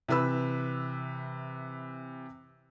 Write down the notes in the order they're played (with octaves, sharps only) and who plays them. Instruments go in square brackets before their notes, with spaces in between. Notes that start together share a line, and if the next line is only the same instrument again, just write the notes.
[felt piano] C3 E3 B4 B5 E6